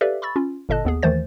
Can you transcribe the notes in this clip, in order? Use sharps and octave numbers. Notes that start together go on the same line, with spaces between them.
G4 A4 B4 D5 E5 F5
B5 C#6 E6 A6
C#4 F4
G1 A#2 A4 D#5 A5 F#6
D#2 B3 G#4
D#2 D#3 E3 A3 C5 A6